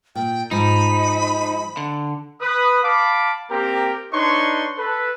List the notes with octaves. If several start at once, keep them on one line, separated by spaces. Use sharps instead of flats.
A#2 G5
G#2 F3 D#4 B5
D3
B4 D#6
F5 A5 B5 D6
A#3 C4 G4 A#4
D4 D#4 B4 C#5 C6 C#6
A4 B4